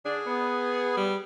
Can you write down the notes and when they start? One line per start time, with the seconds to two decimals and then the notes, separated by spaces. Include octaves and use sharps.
0.06 D3 D4 G#4
0.27 B3
0.97 G3